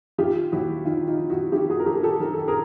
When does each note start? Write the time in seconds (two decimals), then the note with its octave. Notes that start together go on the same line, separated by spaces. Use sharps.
0.18 D#3 F4 G4
0.52 D#2 E4 F#4
0.85 D#3 D#4 F4
1.08 D#4 F4
1.19 D#3
1.30 E4 F#4
1.52 D#3 F4 G4
1.70 F#4 G#4
1.80 A#4
1.86 D#3 G4 A4
1.97 A#4
2.03 G4 A4
2.20 D#3 A#4
2.33 A4
2.48 G#4 A#4